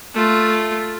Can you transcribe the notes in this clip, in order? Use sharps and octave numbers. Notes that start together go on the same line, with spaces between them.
A3 F4